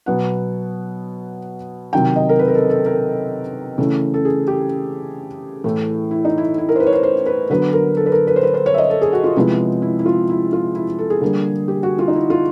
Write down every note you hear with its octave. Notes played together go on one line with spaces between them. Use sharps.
B2 F#3 B3 F#5
C3 D#3 F#3 G5
D#5
A#4
B4
A#4
A4
A4
A#4
C#3 E3 A3
A4
G#4
G4
A2 E3 A3
E4
D#4
E4
E4
A#4
C5
B4
C#5
C5
C5
B4
D3 F#3 B3 B4
A#4
A4
B4
A#4
B4
C5
B4
C5
C#5
E5
D#5
A4
G#4
F#4
F4
C3 F3 G#3 B3 E4
E4
E4
F4
E4
F4
E4
A4
G#4
D3 G3 A#3
G4
F#4
F4
D#4
E4
F4